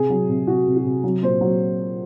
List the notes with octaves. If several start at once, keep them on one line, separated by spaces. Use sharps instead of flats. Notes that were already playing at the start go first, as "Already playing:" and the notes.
Already playing: C3 G#4
F#3
C3
C3 F#4
C3
F#4
C3
F#3
A#2 C5
F#3